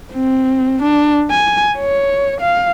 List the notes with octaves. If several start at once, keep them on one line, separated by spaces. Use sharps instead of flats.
C4
D4
G#5
C#5
F5